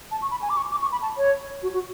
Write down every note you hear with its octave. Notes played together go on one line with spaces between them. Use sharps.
A5
C#6
B5
G#5
D6
C#6
D6
C#6
B5
A5
C#5
F#4
F#4